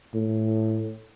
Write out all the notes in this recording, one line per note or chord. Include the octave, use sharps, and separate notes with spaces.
A2